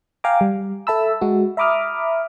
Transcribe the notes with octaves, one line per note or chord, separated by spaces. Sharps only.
F5 G5 G#5 A#5 D6
G3
A4 E5 A5 B5 E6
G#3 F#4
E5 A#5 B5 D6 D#6 F6